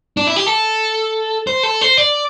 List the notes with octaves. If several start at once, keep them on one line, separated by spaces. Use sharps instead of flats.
D4
E4
G4
A4
C5
A4
C5
D5